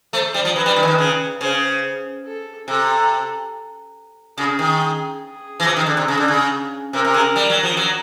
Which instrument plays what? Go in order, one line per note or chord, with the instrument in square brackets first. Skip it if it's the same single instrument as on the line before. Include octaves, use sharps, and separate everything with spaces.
[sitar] A3 [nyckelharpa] C5
[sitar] G3
F3
[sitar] F#3 [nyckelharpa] B4
[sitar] G3
D#3
E3
D#3
C#3
[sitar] C#3 [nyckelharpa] C5
[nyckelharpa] A4
[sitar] C3 [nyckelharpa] A4
[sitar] C#3 [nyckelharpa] G#4
[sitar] D#3
[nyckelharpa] G#4
[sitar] E3
F3
D#3
D3
C3
C#3
D3
C#3
[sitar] C3 [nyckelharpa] A#4
[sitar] C3
C#3
G3
F#3
F3
F#3